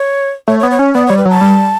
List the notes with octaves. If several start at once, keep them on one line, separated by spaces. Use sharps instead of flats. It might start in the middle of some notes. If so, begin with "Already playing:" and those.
Already playing: C#5
A3 C#5
C#5
B3
C#5
C#4
B3 D5
G3 C#5
B4
F#3 A5
G3